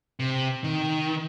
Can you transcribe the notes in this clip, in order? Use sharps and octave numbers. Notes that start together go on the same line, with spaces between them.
C3
D#3